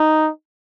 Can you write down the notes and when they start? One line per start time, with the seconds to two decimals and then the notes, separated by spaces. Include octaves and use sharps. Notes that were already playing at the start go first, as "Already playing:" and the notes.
Already playing: D#4